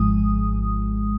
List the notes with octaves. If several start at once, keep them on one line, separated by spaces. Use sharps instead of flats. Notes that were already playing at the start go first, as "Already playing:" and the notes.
Already playing: G#1 G#2 F3 G#3 D#6